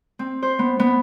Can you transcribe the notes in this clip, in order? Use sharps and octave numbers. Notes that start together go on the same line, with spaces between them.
C4
C5
B3
B3